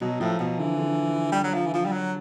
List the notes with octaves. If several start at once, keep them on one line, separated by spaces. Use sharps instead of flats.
B2 F#3
A2 F3
B2
D3 E3
D3
G3
F#3
F3
E3
F3
G3
F#3